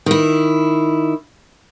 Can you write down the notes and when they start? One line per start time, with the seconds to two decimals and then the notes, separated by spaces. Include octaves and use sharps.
0.06 D#3 E4